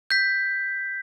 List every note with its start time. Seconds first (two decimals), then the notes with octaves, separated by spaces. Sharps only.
0.10 G6 B6